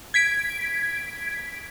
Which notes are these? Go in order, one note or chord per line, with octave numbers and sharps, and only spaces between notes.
G#6 B6 D7